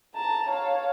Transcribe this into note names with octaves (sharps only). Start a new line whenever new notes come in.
A5 A#5
C#5 F5